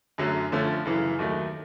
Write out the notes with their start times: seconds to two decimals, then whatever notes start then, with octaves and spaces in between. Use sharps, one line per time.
0.18 F#2 D3 F#3 A3
0.52 D3 F3 A3 C#4
0.85 F#2 C#3 E3
1.19 D#2 D#3 F#3 A3